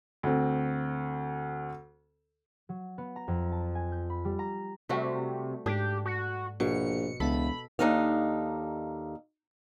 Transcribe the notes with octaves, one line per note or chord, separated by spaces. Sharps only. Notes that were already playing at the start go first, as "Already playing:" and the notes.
D2 C4
F#3
B3
A#5
F2
A5
G#5
G6
B5
G3
A#5
C3 G3 A3 F#4
G#2 D4 G4
F#4
A#1 B2 C#7
E1 C#2 A4 B5
D#2 C#3 D4 D#4 A4 F5